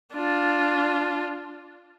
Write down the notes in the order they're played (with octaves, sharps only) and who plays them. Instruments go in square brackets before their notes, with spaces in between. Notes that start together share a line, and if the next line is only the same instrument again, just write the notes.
[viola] D4 F4